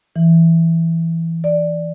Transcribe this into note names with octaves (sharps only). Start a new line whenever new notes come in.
E3
D5